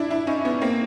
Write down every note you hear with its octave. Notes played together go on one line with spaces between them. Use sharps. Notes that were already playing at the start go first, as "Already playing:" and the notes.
Already playing: D4 E4
D4 E4
C#4 D#4
B3 C#4
A#3 C4